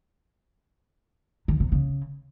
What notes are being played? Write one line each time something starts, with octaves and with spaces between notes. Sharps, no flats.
D#3
C3
C#3